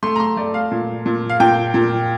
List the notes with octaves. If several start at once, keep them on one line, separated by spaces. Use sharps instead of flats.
A3 C6
A#5
C6
A3 D5
F5
A#2
A#2
F5
A#2 G5
A#2